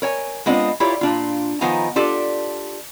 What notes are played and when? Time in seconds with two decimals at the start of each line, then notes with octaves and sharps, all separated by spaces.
0.02 A#4 C#5 G#5
0.46 G#3 B3 C4 D4 F4 D#5
0.80 E4 F4 G4 A#4 C#5 D5
1.01 A#2 D4 F4
1.61 D#3 F3 B3 D#4 G#5 A#5
1.96 D4 F4 G4 A4 D5